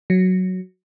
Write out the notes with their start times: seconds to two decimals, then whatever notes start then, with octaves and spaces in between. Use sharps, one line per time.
0.10 F#3